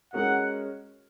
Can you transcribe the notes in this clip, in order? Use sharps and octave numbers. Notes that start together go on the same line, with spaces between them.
G#3 C#4 F#4 A#4 D#5 F#5